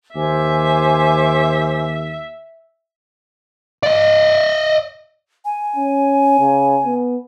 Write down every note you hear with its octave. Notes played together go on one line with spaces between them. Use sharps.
D#2 C5 E5 G#5 D6
D5 D#5
G#5
C#4
C#3
B3